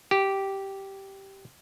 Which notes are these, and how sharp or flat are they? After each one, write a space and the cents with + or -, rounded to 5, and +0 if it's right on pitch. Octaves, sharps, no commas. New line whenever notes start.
G4 -10